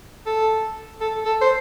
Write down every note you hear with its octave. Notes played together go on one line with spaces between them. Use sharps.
A4
A4
A4
C5